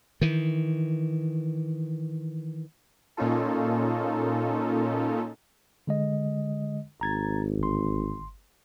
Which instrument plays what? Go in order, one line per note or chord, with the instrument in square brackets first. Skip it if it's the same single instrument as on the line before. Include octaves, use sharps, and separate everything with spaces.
[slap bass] D#3 E3
[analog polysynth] A#2 A#3 C#4 D#4 F4 A4
[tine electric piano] D3 G#3 D#5
[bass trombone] G#1 [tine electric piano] A#5 G#6 A6
[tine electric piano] G1 C6